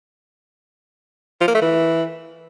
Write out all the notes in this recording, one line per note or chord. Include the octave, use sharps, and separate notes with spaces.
F3
A#3
A3
E3